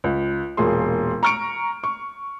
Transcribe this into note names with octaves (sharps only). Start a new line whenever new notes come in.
C#2
E1 A#2 G#4 C6
A#5 C#6 F6 C#7 D7
C#6